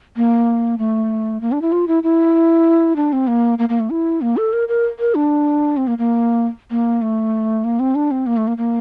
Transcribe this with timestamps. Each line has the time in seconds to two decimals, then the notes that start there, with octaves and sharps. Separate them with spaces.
0.16 A#3
0.78 A3
1.41 A#3
1.52 D4
1.62 E4
1.72 F4
1.88 E4
2.03 E4
2.96 D4
3.13 C4
3.27 A#3
3.59 A#3
3.69 A#3
3.80 A3
3.90 E4
4.21 A#3
4.37 A4
4.53 A#4
4.68 A#4
4.99 A#4
5.15 D4
5.77 C4
5.87 A#3
5.98 A#3
6.71 A#3
7.02 A3
7.64 A#3
7.80 C4
7.95 D4
8.11 C4
8.27 A#3
8.37 A3
8.47 A#3
8.58 A#3